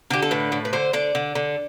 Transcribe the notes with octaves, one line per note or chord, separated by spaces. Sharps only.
D3 G4
A4
A2 B4
A2
B4
D3 C5
D3 D5
D3
D3